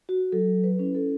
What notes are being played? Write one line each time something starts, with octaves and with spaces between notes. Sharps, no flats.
F#4
F#3 A4
B4
C#4 E4
A4